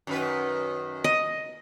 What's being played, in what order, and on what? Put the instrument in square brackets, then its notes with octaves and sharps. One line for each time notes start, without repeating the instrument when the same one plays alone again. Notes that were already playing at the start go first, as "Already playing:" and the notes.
[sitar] F#2 D#3 B4
[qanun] D#5